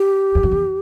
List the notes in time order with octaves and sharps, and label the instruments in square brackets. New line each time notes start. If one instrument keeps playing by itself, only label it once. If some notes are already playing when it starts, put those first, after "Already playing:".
Already playing: [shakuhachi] G4
[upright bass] E2
F2
E2